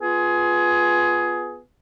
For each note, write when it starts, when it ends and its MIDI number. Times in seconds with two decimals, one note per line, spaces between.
0.02 1.59 59
0.02 1.59 65
0.02 1.59 68